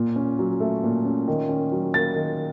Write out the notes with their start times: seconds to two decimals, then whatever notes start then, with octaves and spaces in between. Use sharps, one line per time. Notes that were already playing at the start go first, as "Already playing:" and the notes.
Already playing: A#2
0.16 C#4
0.39 F#3
0.60 A3
0.84 A#2
1.05 C#4
1.28 D#3
1.49 C#4
1.72 F#3
1.94 A#3 A6
2.16 D#3